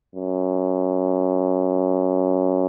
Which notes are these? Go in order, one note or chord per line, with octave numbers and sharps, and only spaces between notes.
F#2